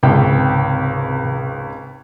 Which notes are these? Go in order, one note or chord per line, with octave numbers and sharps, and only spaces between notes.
G#1 C#2 C3 G5